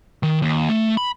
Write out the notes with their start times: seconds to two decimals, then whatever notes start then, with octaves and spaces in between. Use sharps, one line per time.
0.23 D#3
0.42 D#2
0.69 A3
0.97 B5